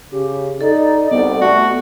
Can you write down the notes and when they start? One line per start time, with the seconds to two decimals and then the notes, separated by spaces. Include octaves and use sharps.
0.12 C#3 G4
0.61 D#4 A4 D5
1.11 C2 B3 D5
1.41 A3 F#4